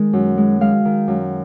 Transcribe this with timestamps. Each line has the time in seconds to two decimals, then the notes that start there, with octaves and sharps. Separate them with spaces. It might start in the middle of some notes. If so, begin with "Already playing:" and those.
Already playing: D#3 G#3
0.13 F#2
0.37 G#3
0.61 G#3 F5
0.85 D#3
1.08 F#2